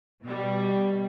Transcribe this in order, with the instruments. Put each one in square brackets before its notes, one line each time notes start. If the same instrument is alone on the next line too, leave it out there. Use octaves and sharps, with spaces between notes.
[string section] B2 G3